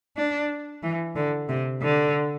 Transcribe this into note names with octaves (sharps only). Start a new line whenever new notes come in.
D4
E3
D3
C3
D3